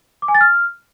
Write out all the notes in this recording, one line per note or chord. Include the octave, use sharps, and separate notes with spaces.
D6
G#5
A6
F6